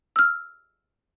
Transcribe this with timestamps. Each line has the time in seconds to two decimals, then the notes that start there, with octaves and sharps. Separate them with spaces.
0.16 E6 F6